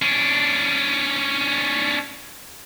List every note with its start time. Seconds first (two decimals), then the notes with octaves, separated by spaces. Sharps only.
0.02 C#4 D4